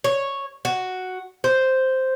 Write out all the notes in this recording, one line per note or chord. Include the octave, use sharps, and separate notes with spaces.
C#5
F#4
C5